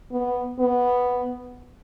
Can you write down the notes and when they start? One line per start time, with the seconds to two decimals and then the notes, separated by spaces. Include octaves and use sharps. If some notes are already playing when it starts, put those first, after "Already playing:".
0.12 B3
0.60 B3